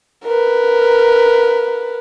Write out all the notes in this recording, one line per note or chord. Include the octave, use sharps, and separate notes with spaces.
A#4 B4